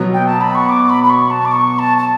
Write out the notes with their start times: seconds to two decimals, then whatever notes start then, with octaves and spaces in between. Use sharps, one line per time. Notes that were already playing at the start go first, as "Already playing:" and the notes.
Already playing: B2 F#3 B3
0.13 G5
0.27 A5
0.41 B5
0.55 C#6
0.69 D6
0.90 B5
1.04 B5
1.10 C#6
1.30 A5
1.45 D6
1.52 C#6
1.79 A5
1.98 A5